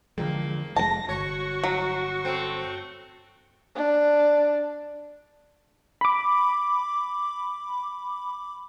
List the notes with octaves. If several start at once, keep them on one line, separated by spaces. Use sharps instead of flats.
E2 D3 F3 G#3 A#3
F1 A#2 G#3 A5 A#6
G1 F#4 C#5 C#6
F#3
A3 C4
D4
B5 D6